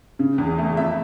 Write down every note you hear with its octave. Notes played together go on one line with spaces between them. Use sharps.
C#3
E2
A3
F2 E5